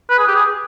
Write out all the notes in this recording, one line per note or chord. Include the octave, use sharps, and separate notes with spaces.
B4
G#4
G4
G#4